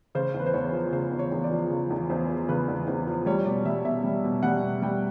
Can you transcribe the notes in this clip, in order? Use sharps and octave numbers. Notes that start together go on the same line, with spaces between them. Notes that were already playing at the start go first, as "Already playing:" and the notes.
C#3 C5
E2
B4
C5
E2 C#5
F3
C#3 C5
E2
C#5
E2
D5
F3
C#3
E2
E2 C5
F3
C#3 B4
E2
E2 C5
F3
G3 C#5
B2 D5
G3 E5
B2 E5
G3
B2
G3 F#5
B2
G3 G5